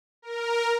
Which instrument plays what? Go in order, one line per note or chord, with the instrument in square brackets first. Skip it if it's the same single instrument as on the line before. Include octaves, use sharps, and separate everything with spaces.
[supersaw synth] A#4